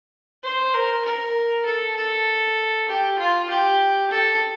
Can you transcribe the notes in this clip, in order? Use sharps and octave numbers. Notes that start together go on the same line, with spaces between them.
C5
A#4
A#4
A4
A4
G4
F4
G4
A4